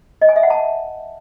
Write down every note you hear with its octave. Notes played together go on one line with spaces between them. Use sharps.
D#5
G#5
E5
F#5
A5